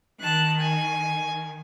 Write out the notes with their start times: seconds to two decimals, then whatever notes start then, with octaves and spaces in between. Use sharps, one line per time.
0.21 D#3 A5 F#6
0.60 G#5